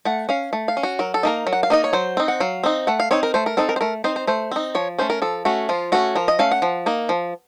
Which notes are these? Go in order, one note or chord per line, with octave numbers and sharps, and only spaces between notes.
A3 F#5
C#4 F5
A3
F5
C#4
F#4
F#3 A#4
A4
A#3 D#4 A#4
F#3
F#5
F5
A#3 D#4 D#5
C#5
F#3 C5
C4 D#4
F#5
F#3 F5
C4 D#4
A3 F#5
F5
C4 D#4 C#5
A#4
A3 C5
A#4
C4 D#4 A4
A#4
C5
A3 A#4
C4 D#4 C5
C5
A3 C5
C4 D#4
F3 C#5
A3 C#4 C5
A#4
F3 A4
A3 C#4 F#4
F3 F4
A3 C#4 F#4
F3 A#4
D#5
A3 C#4 F5
F#5
F3
A#3 D#4
F3